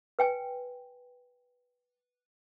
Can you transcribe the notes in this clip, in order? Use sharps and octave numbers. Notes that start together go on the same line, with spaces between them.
B4 G5 G#5